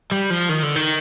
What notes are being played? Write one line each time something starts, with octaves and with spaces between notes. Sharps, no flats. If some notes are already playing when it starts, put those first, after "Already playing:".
G3
F3
D#3
D3
D#3